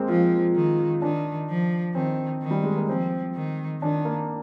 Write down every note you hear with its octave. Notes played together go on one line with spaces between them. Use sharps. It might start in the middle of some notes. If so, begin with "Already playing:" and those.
Already playing: G#3 A#3 C4
F3 F4
D#3
D#3 D4
F3
D#3 C4
D#3
G3
G#3
A#3
F3 C4
D#3
D#3 D4
A#3